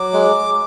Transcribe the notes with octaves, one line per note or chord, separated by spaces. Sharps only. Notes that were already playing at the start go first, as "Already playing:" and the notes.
Already playing: F#3 D6
G#3